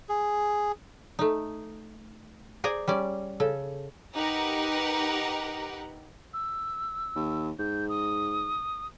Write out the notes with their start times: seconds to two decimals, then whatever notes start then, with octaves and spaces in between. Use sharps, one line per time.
0.09 G#4
1.19 A3 D#4
2.64 G#4 C5 D5 G#5 A#5
2.88 G3 C#4 D5
3.40 C#3 A4
4.14 D#4 G4 A#4 B4 F#5 A#5
6.34 E6
7.16 D#2
7.59 G#2 G6
7.89 D#6